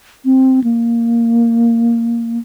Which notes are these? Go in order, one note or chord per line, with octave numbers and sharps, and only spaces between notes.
C4
A#3